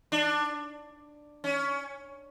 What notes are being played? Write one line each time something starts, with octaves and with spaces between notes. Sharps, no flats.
D4
C#4